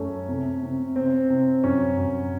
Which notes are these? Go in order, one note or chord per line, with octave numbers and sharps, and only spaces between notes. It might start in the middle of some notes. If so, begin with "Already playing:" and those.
Already playing: F#2 A3 C#4
C3
C3
C3 C4
C3
F#2 C#4
F#2